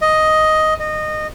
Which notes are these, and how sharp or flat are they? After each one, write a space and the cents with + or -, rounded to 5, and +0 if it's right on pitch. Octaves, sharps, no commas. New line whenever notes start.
D#5 +5
D#5 -20